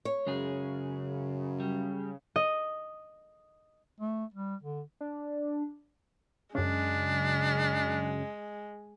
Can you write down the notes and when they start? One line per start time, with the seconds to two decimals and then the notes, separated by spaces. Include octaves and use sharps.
0.05 C#5
0.27 F#2 C#3 G#3 G#4
1.60 G3
2.36 D#5
4.00 A3
4.34 G3
4.63 D3
5.01 D4
6.55 F#2 C#3 G#3 D4